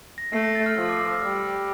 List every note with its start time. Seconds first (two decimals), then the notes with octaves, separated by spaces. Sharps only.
0.18 A#6
0.33 A3 C7
0.44 A#6
0.55 A6
0.66 F6
0.77 F3 E6
0.89 D6
1.00 D6
1.12 E6
1.22 G3 F6